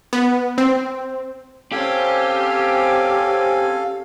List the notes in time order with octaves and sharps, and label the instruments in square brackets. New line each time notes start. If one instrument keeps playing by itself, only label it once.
[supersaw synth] B3
C4
[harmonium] C4 C#4 G#5 [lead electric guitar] G4 [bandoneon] A4 F5